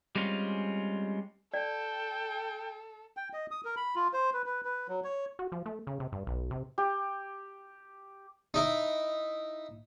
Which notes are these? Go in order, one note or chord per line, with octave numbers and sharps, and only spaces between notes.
G3 G#3 C4 C#4 F4
A4 D5 G5
G5
D#5
D#6
A#4
B5
F4
C5
B4
B4
B4
F#3
C#5
F#4
F3
A3
C#3
C3
G2
B1
C3
G4
D#4 E4